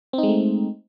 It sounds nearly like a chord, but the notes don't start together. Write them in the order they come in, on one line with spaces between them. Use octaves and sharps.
C4 D#4 G#3 A3